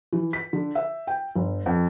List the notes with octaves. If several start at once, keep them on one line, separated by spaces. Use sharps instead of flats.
E3
B6
D3
E5
G5
G1
F2